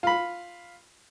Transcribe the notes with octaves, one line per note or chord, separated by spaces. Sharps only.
F4 B5